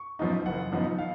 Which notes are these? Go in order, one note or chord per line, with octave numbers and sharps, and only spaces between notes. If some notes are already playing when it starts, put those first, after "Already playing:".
Already playing: C#6
F#2 F3 B3 D#4
F#1 F#5
F#2 F3 B3 D#4
F5